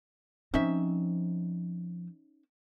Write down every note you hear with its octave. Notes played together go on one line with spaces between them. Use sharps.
F3 C4 C#4 D#4 E5